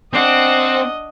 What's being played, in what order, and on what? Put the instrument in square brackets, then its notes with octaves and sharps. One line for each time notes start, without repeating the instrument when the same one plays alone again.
[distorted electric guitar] C4 [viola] D4 F#5 [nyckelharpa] D#5